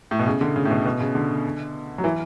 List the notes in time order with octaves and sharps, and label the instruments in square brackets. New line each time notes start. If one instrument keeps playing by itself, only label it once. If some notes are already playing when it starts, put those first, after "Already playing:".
[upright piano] A2
B2
C#3
D3
C#3
A2
B2
B2
C#3
D3
F#3
E3